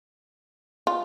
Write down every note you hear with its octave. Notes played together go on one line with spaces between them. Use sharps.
F4